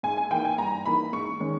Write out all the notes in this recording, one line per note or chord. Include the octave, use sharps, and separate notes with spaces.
G#2 G#5
G#5
E3 A#3 D#4 G5
G#5
G2 A#5
E3 A#3 D#4 B5
G#2 C#6
D#3 G#3 C#4